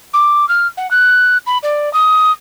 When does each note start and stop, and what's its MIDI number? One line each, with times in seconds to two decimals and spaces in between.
0.14 0.48 86
0.49 0.67 89
0.77 0.90 78
0.91 1.38 90
1.47 1.58 83
1.63 1.92 74
1.93 2.32 87